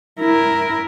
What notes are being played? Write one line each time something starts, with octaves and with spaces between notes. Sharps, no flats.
E4 A#4